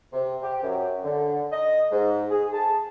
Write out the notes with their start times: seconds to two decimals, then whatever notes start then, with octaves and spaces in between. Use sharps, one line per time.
0.12 C3
0.42 G4
0.63 F#2
1.04 D3
1.51 D#5
1.90 G#2
2.30 G#4
2.53 A5